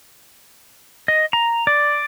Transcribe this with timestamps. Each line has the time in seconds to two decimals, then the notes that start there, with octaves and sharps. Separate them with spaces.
1.08 D#5
1.33 A#5
1.67 D5